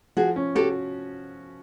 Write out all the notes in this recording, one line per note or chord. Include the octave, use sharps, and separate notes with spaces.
F3 F#4 G#4
C#4
F#4 G4 A4